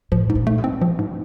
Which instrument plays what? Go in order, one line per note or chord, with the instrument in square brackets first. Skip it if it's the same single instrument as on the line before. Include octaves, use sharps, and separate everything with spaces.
[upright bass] A2 [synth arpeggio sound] F3
[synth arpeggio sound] G#2
[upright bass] A#2
[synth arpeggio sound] A3
[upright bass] B2
[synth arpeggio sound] C4
F3
G#2